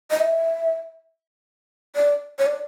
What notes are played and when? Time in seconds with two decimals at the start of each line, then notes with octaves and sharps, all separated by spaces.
0.11 D#5
0.20 E5
1.96 D5
2.39 C#5
2.46 D5